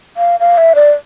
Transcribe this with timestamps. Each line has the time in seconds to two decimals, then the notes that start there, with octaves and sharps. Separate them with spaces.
0.17 F5
0.40 F5
0.58 E5
0.75 D5